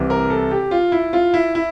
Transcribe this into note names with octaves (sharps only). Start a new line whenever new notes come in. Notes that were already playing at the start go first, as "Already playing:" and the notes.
Already playing: C2 C3 E3
A#4
A4
G4
F4
E4
F4
E4
E4